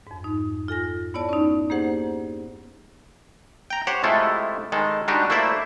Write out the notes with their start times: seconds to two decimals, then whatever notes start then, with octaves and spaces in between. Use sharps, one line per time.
0.07 F2 G#2
0.24 D#4
0.68 F4 A4 G#5 A#6
1.14 B3 E4 C#5 D5 A5
1.29 C#4 D#4
1.70 A#3 D#4 G4 G#4 C5 F#5
3.70 G5 A#5
3.87 G4 C5 C#5 F#5
4.04 C3 G#3 A3 E4 F4 A4
4.72 D#3 G#3 A4
5.08 G3 G#3 D4 D#4 F#4 G4
5.30 A3 A#3 E4 C5 D5 E5